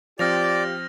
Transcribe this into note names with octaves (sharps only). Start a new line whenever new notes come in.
F3 C4 F4 G4 D5 F6 A#6 F7